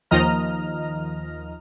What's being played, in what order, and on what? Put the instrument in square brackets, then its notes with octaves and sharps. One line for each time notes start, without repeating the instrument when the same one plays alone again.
[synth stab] D#2 D#3 F3 D#5 A#5 F6